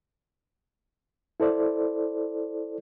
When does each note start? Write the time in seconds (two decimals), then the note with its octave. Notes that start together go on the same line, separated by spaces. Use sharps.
1.40 E4 A4 C5 D5